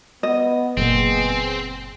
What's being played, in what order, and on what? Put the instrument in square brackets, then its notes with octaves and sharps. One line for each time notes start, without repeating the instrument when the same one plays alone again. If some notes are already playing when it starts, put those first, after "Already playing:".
[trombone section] B3 [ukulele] D#5
[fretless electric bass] F#1 A#2 [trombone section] B3 G#4 [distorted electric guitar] C4